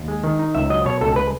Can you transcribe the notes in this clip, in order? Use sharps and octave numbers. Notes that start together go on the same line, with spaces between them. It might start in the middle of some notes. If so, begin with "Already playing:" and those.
Already playing: D#2
G#3
D#3
D#4
C#2 E5
F#3 D#5
B2 C#5
C#2 A4
B4